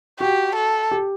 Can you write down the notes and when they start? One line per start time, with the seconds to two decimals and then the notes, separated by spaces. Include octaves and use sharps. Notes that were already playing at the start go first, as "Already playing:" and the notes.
0.20 F#4 G4
0.55 A4
0.91 G4